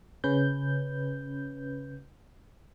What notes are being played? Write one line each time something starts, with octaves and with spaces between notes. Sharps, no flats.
C#3 C#4 B4 G6